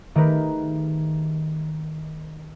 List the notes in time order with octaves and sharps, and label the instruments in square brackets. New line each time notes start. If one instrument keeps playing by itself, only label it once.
[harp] D#3 A3 G4 G#4 A#4 B4